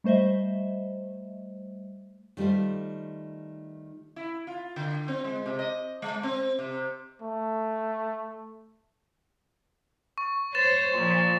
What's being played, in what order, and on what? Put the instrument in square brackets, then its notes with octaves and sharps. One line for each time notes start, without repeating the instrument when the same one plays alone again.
[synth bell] G3 A3 C5 D#5 E5
[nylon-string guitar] D#3 G3 A3 F4 C5
[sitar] E4
F4
D3
C4
G#3
C3
D#5
G#3
C4
C3
[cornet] A3
[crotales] C#6
[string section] C5 C#5 [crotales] A6 E7
[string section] A#2 F3